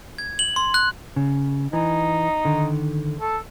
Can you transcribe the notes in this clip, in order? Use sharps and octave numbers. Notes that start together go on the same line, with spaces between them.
G#6
F#7
C6
F#6
C#3
E3 D#4
D3 D#3
A4